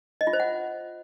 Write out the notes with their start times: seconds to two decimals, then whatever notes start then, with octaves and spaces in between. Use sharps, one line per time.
0.21 D#5
0.27 F4
0.33 C5
0.40 F#5